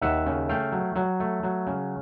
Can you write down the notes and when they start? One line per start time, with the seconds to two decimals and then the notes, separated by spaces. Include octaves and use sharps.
0.01 D#2 E5 F#5
0.26 C#3
0.49 A3 F5 G5
0.72 F#3
0.96 F#3
1.20 A3
1.43 F#3
1.67 C#3